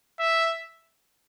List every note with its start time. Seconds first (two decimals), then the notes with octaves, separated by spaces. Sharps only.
0.20 E5